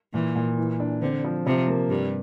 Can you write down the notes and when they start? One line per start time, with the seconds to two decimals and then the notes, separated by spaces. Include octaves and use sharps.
0.14 A#2 E3
0.35 A#2
0.58 E3
0.80 D4
1.01 D3 C4
1.24 F3
1.46 C3 F3
1.68 A#3
1.90 G2 G3